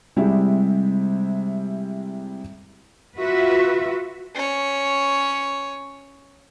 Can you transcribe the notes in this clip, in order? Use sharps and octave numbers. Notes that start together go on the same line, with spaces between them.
C3 G3 G#3 C4 E4 G4
F4 F#4 B4 E5
C#4 C#5